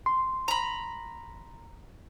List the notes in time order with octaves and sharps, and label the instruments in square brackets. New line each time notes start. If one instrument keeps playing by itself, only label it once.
[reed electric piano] C6
[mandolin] A#5 B5